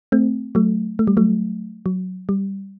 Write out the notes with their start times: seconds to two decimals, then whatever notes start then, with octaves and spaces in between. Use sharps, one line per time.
0.12 A3 C4
0.55 F#3 A3
0.99 A3
1.07 G3
1.17 F#3 A3
1.86 F#3
2.29 G3